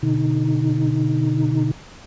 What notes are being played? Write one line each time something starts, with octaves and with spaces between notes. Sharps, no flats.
B2 D3 D#4